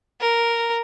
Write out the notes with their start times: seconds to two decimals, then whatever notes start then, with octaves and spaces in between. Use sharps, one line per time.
0.21 A#4